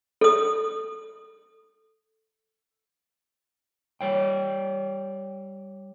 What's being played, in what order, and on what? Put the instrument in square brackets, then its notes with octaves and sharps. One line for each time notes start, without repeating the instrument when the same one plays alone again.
[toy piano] A4 D#6
[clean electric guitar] G3 C#5 G5